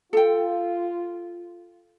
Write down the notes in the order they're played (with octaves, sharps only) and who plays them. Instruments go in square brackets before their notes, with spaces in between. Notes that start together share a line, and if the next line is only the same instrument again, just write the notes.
[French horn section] F4 [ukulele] A4 G5